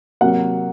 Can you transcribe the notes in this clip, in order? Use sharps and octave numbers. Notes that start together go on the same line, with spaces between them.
C3 F#3 A#3 F#5